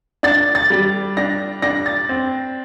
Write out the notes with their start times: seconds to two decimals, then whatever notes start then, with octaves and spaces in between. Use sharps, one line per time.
0.23 D4 A6
0.55 A6
0.70 G3
1.17 D4 A#6
1.62 D4 A#6
1.86 A6
2.09 C4